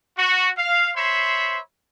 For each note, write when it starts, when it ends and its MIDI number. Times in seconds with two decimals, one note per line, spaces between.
0.18 0.50 66
0.57 0.90 77
0.97 1.58 72
0.97 1.58 73
0.97 1.58 76
0.97 1.58 83
0.97 1.58 84